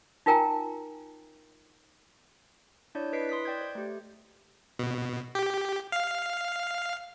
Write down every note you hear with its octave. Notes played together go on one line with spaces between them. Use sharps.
D#4 F4 A#4 G5 G#5 A#5
D4 E4 C#5 D5 G6
E4 B4 D#5 B6 C7 D7
C6 D#6 F#6 B6
D5 G5 G6 G#6
C5
A3 G4
B2
G4
F5